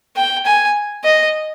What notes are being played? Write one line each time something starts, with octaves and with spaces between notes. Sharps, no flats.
G5
G#5
D#5